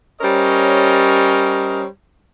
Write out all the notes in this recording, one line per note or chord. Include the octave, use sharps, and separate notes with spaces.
G3 C#4 A#4 C5 C#5 D#5